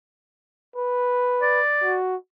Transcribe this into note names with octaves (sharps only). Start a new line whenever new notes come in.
B4
D5
F#4